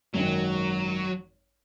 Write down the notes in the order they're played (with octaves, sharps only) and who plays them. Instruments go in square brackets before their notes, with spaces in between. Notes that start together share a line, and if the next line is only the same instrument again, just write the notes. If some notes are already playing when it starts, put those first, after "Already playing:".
[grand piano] G#1 F#2 D#3 [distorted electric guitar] F#3